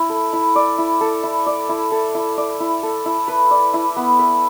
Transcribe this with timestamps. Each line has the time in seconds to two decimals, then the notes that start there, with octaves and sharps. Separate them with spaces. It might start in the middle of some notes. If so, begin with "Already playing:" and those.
Already playing: E4
0.10 A4
0.33 E4
0.56 D5
0.78 E4
1.01 A4
1.23 E4
1.46 D5
1.69 E4
1.92 A4
2.15 E4
2.37 D5
2.60 E4
2.83 A4
3.06 E4
3.28 B4
3.51 D5
3.74 E4
3.96 B3
4.19 B4